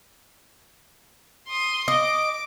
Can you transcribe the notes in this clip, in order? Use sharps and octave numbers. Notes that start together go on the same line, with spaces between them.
C6 D#6
D#5 D6